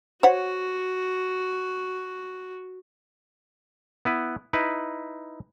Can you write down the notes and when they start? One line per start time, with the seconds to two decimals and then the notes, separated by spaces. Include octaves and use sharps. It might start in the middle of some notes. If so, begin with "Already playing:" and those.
0.23 F#4 C5 C#5 F#5
4.05 B3 E4 B4
4.53 D#4 E4 B4